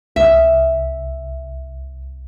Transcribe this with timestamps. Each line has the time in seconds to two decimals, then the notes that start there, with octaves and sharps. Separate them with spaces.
0.16 C2 C3 E5